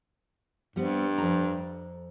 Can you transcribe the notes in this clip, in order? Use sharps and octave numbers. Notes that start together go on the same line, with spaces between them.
G2 G3 B3 C4
F2 A#5